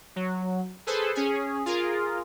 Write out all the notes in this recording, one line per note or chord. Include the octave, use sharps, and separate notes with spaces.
F#3
G#4 A4 B4 C5
C#4 G#4
F4 G#4 A#4